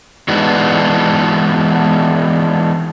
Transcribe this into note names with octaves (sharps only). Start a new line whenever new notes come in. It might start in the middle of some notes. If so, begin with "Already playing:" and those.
E3 G#3 B3 D4 D#4 F#4